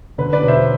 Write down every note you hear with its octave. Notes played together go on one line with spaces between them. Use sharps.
D3 B4
B4 D5
E1
C5 E5